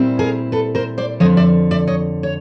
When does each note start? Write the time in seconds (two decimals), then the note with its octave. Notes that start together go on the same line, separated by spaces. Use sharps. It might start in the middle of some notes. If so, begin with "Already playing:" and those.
Already playing: A#2 G3 C4 E4
0.19 G#4 A#4
0.52 A4 B4
0.75 A#4 C5
0.98 C5 D5
1.20 F2 D3 F3 C#5 D#5
1.37 D5 E5
1.71 D5 E5
1.87 C#5 D#5
2.23 C#5